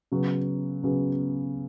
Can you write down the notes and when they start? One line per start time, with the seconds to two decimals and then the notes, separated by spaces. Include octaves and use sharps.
0.12 C#3 F#3 B3
0.83 C#3 F#3 B3